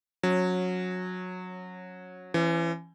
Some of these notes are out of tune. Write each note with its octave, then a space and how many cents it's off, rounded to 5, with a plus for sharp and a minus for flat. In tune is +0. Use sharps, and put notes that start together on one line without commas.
F#3 -20 C#4 -5
E3 +30 C#4 -20 E5 +30